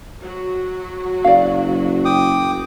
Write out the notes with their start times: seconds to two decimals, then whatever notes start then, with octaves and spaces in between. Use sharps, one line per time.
0.21 F#3 F#4
1.24 F#1 D5 F5
2.05 G5 D6 D#6